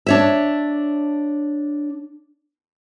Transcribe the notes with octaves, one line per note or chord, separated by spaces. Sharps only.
D4 C#5 E5